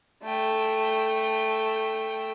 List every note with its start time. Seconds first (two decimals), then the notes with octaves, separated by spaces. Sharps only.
0.23 A3 G5